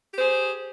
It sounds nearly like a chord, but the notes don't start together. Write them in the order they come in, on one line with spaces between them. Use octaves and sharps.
G4 C5 G#4